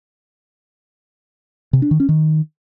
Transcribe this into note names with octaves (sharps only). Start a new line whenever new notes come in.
C3
D4
D#3
C#4
D#3